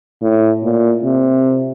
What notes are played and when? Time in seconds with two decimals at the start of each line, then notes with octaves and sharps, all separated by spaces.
0.22 A2
0.63 A#2
1.04 C3